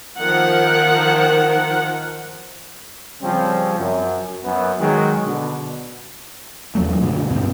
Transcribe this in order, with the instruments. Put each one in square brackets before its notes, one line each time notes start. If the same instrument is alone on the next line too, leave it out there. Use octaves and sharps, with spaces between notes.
[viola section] D#3 F3 A#4 F#5
[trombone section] C#3 F3 G3 C4 C#4
F#2
F#2 B3
D#3 F#3 G#3
B2 D3
[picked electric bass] E2 F#3 A3
F#2 B2 D3
G2 B2 C4